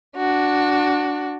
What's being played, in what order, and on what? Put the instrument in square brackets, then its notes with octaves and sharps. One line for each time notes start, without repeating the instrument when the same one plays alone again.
[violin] D4 F#4